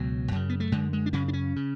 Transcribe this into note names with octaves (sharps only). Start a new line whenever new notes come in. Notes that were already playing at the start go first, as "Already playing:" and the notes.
Already playing: C#2 B2 F#3
F#2 C#3
B3
A3
F#2 D3 G#3
G#3
D4
F#2 C#3 C#4
D4
C#4
C#3